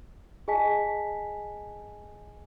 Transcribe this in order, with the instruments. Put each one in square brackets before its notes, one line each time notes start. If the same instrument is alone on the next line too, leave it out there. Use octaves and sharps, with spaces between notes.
[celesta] G#4 D#5 G#5 A5 B6